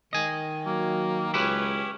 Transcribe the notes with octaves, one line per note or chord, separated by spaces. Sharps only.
D#3 D#5 G#5
F#3 A#3
C#2 C#4 E4 G4 B4